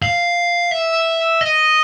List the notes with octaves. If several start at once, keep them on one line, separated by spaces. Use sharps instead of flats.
F5
E5
D#5